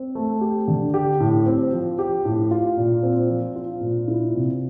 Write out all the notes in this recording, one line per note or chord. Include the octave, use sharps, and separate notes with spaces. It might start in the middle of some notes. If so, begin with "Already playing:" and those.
Already playing: C4
A3
G4
D3
G4
A2
C4
F3
G4
A2
F4
A#2
C4
F3
F4
A#2
E4
C3